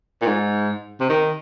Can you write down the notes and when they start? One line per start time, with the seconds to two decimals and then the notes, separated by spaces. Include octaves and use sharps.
0.22 A#2
0.26 G#2
1.01 C3
1.09 D#3